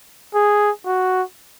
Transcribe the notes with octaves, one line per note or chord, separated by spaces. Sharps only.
G#4
F#4